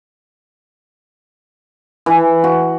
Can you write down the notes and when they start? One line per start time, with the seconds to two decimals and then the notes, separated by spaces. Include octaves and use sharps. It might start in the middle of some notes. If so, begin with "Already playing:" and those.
2.06 E3
2.44 F#4